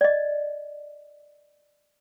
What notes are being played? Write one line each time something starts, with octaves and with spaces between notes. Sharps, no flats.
D5 D#5